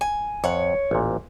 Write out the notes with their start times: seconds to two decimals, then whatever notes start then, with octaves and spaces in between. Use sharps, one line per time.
0.01 G#5
0.44 F2 C#5 F#5
0.91 A1 A#2